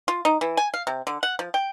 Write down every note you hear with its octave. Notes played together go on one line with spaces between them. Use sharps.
F4
D#4
E3
G#5
F5
C3
D3
F#5
F3
G5